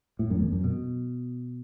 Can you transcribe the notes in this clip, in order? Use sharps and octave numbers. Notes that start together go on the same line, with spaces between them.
A2
F#2
E2
F#2
B2